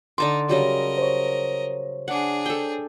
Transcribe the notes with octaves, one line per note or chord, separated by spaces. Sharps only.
D3 D#4 A5 C6 D6
C#3 F#3 G3 A#4 D#5
C5 C#5
D4 G#4 F#5
A4 G5